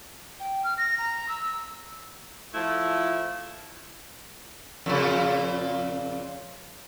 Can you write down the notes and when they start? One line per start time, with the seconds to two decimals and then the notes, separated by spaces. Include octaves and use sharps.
0.40 G5
0.64 F6
0.78 A#6
0.98 A#5
1.29 E6
2.54 F3 A3 E4 F4
4.86 F2 A#2 C#3